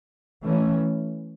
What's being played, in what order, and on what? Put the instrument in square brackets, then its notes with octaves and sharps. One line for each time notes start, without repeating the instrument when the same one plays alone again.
[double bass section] E3 A3 C#4